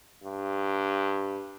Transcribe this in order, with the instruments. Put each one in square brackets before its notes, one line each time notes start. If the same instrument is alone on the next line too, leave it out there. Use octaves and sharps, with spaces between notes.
[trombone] G2